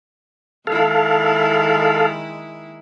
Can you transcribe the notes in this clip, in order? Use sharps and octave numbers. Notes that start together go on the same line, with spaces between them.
D#3 G#3 E4 A4 F5